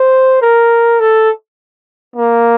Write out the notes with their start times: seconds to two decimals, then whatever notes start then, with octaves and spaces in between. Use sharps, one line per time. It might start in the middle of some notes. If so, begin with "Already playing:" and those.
Already playing: C5
0.42 A#4
1.00 A4
2.16 A#3